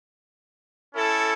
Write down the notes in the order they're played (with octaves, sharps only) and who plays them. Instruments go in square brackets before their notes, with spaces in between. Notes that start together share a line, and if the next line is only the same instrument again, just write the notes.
[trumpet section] C#4 E4 A4